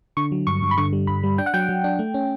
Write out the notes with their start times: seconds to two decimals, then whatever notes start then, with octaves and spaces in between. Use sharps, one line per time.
0.17 D3 C#6
0.32 F#3
0.47 G2 C#6
0.62 G2
0.71 B5
0.78 D3 C#6
0.93 G3
1.07 G2 B5
1.23 G3
1.38 D4 G5
1.46 F#5
1.54 F#3 G5
1.69 F#3
1.84 D4
1.99 A3
2.14 C#4